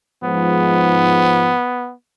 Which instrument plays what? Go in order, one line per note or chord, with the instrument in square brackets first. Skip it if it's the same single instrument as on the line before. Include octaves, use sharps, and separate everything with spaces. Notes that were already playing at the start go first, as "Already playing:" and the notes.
[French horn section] G#2 F3 [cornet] B3